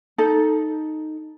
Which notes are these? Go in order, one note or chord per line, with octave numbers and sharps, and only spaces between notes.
D#4 A4